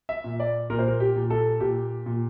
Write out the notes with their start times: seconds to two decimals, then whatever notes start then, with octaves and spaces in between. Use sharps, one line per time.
0.09 E5
0.24 A#2
0.40 D5
0.70 A#2 A#4
0.78 C5
0.88 A#4
1.00 G4
1.16 A#2
1.30 A4
1.60 A#2 G4
2.06 A#2